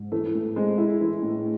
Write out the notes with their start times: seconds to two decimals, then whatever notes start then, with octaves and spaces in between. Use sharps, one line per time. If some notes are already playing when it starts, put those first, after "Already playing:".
Already playing: G#2
0.12 E3 A3
0.34 A2 A3
0.56 G#3 C4
0.78 E4
1.01 E3
1.22 A2